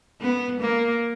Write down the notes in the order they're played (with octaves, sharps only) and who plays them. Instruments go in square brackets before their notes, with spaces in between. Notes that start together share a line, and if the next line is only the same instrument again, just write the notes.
[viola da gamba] B3
A#3